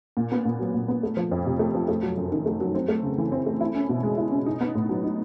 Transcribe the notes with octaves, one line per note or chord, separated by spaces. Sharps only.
A#2
B3
A#2
F#3
A#2
B3
A3
F3
F2
C3
A3
F3
A3
F#3
F#2
D#3
A3
F#3
C4
A3
C#3
E3
C4
A3
E4
C#4
B2
G#3
E4
C#4
D#4
B3
A2
F#3
D#4